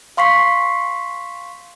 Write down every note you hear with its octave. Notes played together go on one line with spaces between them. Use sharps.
F5 C6 C#6 B6 C7